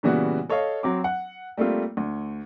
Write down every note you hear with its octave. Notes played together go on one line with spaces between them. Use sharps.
A#2 C#3 E3 G3 B3 F#4
A4 C#5 D#5 F5
F#3 C4 D6
F#5
G3 A3 A#3 C4 F4
D2